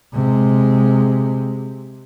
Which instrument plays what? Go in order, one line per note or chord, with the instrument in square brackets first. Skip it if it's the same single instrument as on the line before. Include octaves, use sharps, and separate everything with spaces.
[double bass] C3 G#3